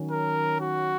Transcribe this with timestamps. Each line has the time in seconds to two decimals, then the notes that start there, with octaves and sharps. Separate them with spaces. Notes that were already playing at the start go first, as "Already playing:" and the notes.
Already playing: D#3 F#3 C#4
0.11 A#4
0.60 F#4